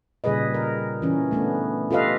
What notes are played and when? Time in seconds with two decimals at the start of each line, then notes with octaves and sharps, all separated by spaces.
0.24 A#2 C#3 G3 G#4 B4 D#5
0.54 A#4
1.02 E3 C#4
1.31 A3 B3 D4
1.90 F4 G4 A4 B4 D#5 F5